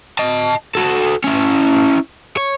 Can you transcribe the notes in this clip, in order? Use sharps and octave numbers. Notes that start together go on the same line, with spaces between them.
D#5 A5
F#4 A4
C#4 E4
C#5